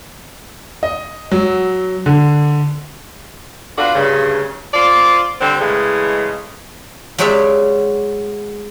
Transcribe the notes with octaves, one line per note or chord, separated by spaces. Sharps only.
D#5
F#3
D3
B3 D4 F4 F#4
D2 G2 C#3
F4 C5 D5
D3 G3 C4
A2 C#3 E3 G#3
F#3 G#3 G4 C#5 D5 E5